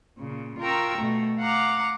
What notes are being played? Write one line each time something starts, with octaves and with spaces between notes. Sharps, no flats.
A#2 C#3
F4 A#4 G5 A#5 C#6 E6
B2 A3
F5 F#5 A#5 D6